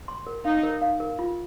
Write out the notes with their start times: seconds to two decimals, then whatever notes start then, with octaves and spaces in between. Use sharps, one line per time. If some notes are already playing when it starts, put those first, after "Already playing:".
0.08 C6
0.27 A#4
0.45 D#4 F5
0.63 A#4
0.82 F5
1.00 A#4
1.19 F4